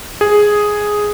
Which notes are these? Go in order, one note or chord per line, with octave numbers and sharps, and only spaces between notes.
G#4